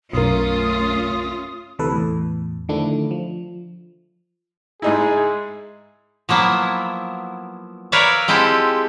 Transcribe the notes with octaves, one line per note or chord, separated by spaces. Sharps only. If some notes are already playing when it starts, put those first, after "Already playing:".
B1 F#2 A3 C#4 F4 A#4 D#6
D2 C3 E3 A4 B4
E2 A2
D3 D#3 F3 A3 D4 E4
F3
G#2 D#4 E4 G#4
F3 F#3 A#3 B3 E4
A#4 B4 C#5 D5 E5 F5
G#3 C4 E4 F4 G4 A4